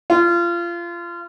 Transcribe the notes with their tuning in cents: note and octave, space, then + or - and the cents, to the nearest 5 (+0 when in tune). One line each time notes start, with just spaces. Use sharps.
F4 -25